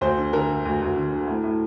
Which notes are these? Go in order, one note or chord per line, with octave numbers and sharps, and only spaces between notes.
D2 C5
D3
D3 A#4
D3
D2
D2
D3
D3
A2
A2